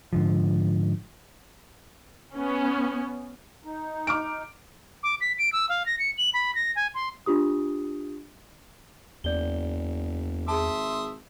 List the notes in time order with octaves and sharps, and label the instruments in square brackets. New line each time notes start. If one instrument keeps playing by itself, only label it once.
[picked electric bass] G#2 D3 F3
[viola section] B3 C#4
[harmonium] D#4
[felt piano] D6 F6 D7
[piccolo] D6
B6
D7
E6
F5
A#6
C#7
F#7
B5
A#6
G#5
C6
[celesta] D4 F4 G4 D#6
[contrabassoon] F#1 [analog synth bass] E2 [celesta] D5 G7
[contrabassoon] G#1 [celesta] G#4 A5 [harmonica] E5 C6 D#6